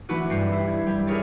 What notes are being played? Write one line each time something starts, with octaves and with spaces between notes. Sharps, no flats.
E3 A3 D4 E4 F#4 B4
G2 G3 C7
E4
G#6
G3
E4 G#4 A#4 C#5 D5